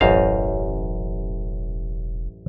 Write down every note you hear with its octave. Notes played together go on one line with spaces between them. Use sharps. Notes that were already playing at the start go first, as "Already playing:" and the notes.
E1 A1 F#2 C5 C#5 D#5 F5